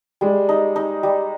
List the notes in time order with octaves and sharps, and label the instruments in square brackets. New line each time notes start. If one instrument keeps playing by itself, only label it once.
[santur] G3 [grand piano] G#3
[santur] D#4
D#4
G3